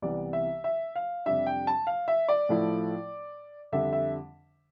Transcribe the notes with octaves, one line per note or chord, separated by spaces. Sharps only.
C2 C3 E3 B3 D5
E5
E5
F5
F2 C3 G3 D4 E5
G5
A5
F5
E5
D5
A2 F3 A3 E4
F2 D3 G3 D4 E5
E5